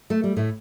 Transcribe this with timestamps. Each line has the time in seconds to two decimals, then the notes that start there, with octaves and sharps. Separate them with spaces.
0.10 A3
0.24 G3
0.36 A2 A3